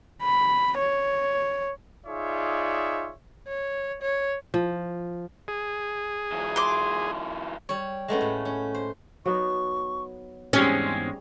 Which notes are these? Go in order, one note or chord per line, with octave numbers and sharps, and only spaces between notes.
B5
C#5
D#4 F4 G#4 C#5 D5 E5
C#5
C#5
F3
G#4
E3 F#3
C6 D6
G3 C#5
G#3 A3 B3 C#4
A2
C#4
C5
F#3 B3 D#4 C#6
E2 G#2 G3 G#3 C4 C#4 G#4 E5